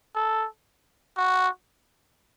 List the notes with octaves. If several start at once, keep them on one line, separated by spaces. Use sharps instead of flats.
A4
F#4